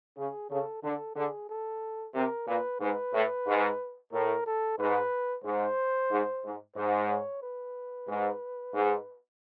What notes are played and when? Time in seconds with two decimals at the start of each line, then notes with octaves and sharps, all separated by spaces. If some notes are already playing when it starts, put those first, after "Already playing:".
0.17 C#3 G#4
0.50 C#3 A4
0.83 D3 A4
1.16 D3 G#4
1.49 A4
2.14 C3 A#4
2.47 A#2 B4
2.81 G#2 B4
3.13 A2
3.47 G#2
4.12 A2 A#4
4.46 A4
4.78 G#2 B4
5.44 G#2 C5
6.11 G#2
6.44 G#2
6.76 G#2 C5
7.09 C#5
7.42 B4
8.08 G#2
8.74 G#2